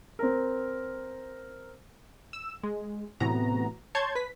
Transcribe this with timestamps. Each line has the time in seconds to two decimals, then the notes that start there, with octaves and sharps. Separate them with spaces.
0.19 C4 A#4
2.33 E6 E7
2.63 G#3
3.20 A2 C3 E3 B3 F#4 A#5
3.95 C#5 A5 C6 G6 G#6
4.15 B4 B6